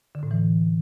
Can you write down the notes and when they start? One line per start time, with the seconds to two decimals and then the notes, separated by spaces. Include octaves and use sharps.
0.15 D3
0.23 A2
0.31 E3